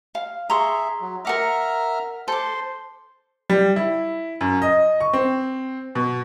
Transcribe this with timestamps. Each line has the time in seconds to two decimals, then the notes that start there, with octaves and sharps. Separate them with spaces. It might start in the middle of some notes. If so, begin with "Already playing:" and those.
0.15 F5
0.50 G#4 E5 A#5 C6 C#6
1.01 F#3
1.25 A#4 E5 F#5 A#5 D6 F6
2.28 A4 C5 C6 D6
3.50 G3
3.76 E4
4.41 F#2
4.62 D#5
5.01 C#6
5.13 C4
5.95 B2